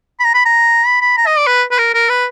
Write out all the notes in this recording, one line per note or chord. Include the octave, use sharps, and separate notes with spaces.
B5
A#5
B5
A#5
B5
B5
A#5
D#5
D5
B4
B4
A#4
A#4
B4